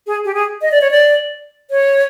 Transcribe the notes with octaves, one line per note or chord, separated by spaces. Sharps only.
G#4
G4
G#4
D#5
D5
C#5
D5
C#5